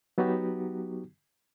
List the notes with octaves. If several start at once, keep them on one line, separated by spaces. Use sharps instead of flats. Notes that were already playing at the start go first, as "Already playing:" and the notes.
F#3 B3 D#4 F#4 G4